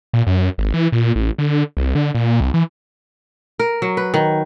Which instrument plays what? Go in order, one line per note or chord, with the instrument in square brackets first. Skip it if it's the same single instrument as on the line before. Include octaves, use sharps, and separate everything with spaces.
[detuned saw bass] A#2
F#2
G#1
E3
A#2
A1
D3
C2
D3
A#2
C2
E3
[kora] A#4
F#3
B4
D#3